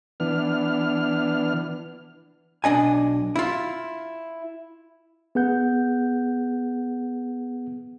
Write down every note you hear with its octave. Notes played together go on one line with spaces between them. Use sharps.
E3 B3 D4 F6
B1 D4 D#5 G#5
E4 F4
B3 G#4 F#5 G6